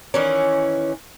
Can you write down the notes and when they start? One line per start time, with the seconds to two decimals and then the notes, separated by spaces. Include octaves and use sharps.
0.14 D#3 E3 C#4